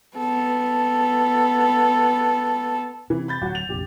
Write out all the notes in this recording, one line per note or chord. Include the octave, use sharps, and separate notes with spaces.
B3 A4
C3 E3
B5 G6 A6
D1 F#3 F#4
F7
F1 A#1 G4